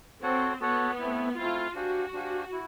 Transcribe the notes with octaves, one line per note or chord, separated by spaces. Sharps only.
C4 F#4 A4 C#5 F#5
B3 F#4 A4 C#5 F#5
A3 C4 E4
A3 C4 E4 F4
D4 F#4 G4 C5 F5 G#5
D4 G4 C5 F5 G#5
E4